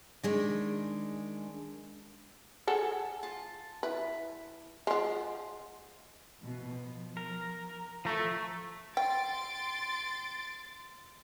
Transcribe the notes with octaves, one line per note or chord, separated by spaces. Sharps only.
D#3 G#3 D4
G#4 A4 F#5
F4 A5
E4 B4
F3 G#3 F#5 C6
B2 E3
F3
A#4
F3 A3 A#5 C#6
G5 C6 A6 D7